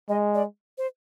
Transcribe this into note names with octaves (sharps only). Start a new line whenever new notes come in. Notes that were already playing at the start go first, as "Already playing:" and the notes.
G#3 D#5
D5
C5